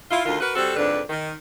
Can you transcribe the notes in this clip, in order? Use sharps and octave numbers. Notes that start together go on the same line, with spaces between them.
E4 F4
D2 D#3 F4
F#4 A#4 B4
G3 C4 F#4 A4
F2 G#2 D3 D4 B4
D#3